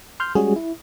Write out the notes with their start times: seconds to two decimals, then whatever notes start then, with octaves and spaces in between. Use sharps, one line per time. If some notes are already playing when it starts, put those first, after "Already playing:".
0.20 C6 F6 G6
0.35 G3 G#3 C#4 F#4 G#4
0.56 E4